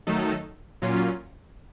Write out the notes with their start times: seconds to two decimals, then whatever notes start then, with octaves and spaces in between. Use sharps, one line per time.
0.07 D#3 F#3 A3 D#4 A4
0.82 A#2 F#3 A#3 C#4 F4